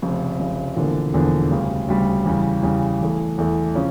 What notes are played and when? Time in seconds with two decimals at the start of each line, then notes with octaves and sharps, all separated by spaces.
0.02 F1 F2 C#3
0.39 F1 F2 C#3
0.76 E1 E2 D3 F3 A#3
1.13 E1 E2 D3 F3 A#3
1.51 D2 C#3 G3
1.88 D2 C#3 G3
2.26 E2 C#3 G3
2.63 E2 C#3 G3
3.01 E2 E3 A3
3.38 E2 E3 A3
3.75 C#3 F3 C#4